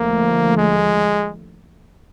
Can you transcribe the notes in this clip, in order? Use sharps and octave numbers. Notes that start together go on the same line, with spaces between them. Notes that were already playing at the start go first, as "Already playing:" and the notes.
Already playing: D#2 D3 F3 A3 A#3
G#3